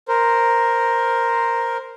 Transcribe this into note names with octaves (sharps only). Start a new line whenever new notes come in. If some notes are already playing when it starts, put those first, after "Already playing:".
A#4 C5